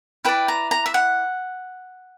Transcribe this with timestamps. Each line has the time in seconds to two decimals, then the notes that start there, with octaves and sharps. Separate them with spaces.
0.25 E4 B4 D5 G5
0.48 A#5
0.71 A#5
0.86 E5
0.94 F#5